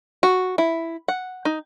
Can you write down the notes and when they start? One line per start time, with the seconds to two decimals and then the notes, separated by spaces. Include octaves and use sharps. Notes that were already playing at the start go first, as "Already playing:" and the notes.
0.23 F#4
0.58 E4
1.08 F#5
1.45 D#4